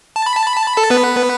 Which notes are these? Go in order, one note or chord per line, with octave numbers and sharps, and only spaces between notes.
A5
B5
A5
B5
A5
B5
A4 A5
B3 B4